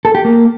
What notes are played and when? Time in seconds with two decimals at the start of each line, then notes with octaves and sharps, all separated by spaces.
0.05 A4
0.15 G4
0.25 A#3